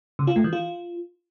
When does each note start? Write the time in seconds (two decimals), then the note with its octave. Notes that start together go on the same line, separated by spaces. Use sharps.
0.19 C#3
0.27 F4
0.36 A3
0.44 E3
0.53 F4